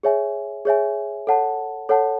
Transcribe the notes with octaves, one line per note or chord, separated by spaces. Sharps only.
G#4 C#5 E5 G#5
G#4 C#5 E5 G#5
A4 C#5 F#5 A5
A4 C#5 F#5 A5